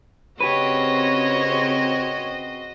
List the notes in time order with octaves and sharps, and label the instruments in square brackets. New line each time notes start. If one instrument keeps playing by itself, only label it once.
[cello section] C#3 C4 [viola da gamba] F#4 D#5 [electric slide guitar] G4 B4 [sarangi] C#5